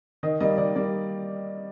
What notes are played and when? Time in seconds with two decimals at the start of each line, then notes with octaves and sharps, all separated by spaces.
0.23 D#3 D#5
0.40 G3 A#3 D#5
0.58 D#3 D5
0.76 G3 A#3 D5